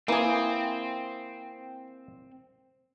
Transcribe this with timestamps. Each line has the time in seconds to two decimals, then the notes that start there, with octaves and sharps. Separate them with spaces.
0.08 E3 A#3 C4 G#4